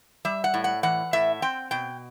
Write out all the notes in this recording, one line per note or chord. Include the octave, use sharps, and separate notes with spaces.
G3 E5
F#5
A2
F#5
E3 F#5
A2 E5
C4 G5
B2 G5